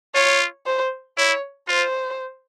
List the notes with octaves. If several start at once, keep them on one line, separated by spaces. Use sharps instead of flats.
F4 C#5
C5
E4 C#5
F4 C5